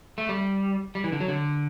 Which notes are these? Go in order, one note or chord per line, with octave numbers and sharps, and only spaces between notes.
A3
G3
G3
E3
D3
F#3
D3